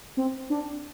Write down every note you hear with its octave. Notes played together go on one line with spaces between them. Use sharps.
C4
D4